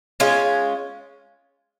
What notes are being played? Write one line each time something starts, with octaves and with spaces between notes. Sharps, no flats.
G#3 C#4 F4